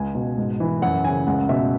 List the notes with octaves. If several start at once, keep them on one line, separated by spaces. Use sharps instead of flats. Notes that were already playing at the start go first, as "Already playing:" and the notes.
Already playing: C#2 G#5
B2
G#2
E3
F#2 F#5
C#3 G#5
C#2 F#5
B2 E5